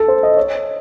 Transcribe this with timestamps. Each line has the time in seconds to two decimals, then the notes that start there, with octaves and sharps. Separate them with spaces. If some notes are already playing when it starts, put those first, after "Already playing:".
Already playing: A4
0.08 C5
0.23 D#5
0.37 C#5